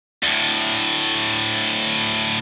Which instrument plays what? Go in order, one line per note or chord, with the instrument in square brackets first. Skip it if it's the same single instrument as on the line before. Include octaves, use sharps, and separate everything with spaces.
[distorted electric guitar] D2 A2